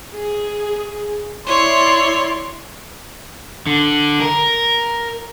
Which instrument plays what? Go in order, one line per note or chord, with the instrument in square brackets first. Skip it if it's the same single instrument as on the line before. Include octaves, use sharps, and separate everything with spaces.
[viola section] G#4
[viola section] E4 D5 C6 [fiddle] C#5
[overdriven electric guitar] D3
A#4